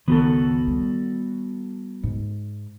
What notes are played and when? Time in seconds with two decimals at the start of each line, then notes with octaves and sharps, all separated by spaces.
0.08 C#2 G2 D#3 B3 F#4 A4
0.67 G3
2.03 G#2